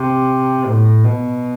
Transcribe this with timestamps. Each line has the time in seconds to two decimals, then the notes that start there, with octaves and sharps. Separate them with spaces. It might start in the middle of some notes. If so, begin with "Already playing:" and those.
Already playing: C3
0.65 A2
1.04 B2